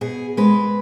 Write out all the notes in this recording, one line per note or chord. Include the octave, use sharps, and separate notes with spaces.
B2 G#4
G#3 B4